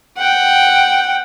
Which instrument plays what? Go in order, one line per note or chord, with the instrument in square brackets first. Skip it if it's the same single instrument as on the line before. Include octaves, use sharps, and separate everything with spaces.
[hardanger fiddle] F#5 G5